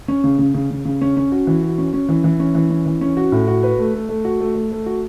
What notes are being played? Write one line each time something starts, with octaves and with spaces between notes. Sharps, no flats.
C#4
C#3
C#3
C#3
C#3
C#3
C#4
C#4
F#4
E3
F#4
C#4
C#4
E3
E3
C#4
E3
C#4
E3
C#4
F#4
A2
F#4
B4
A3
A3
A3
F#4
A3
A3
A3
F#4